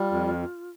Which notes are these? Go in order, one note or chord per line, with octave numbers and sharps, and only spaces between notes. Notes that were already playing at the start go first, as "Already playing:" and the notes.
Already playing: G3 F4
F2